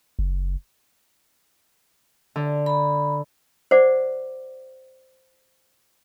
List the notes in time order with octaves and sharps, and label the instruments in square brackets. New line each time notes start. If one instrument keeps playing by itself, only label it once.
[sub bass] F#1
[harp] D3
[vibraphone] A#5 B5
[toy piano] C5 D5 F#5 D6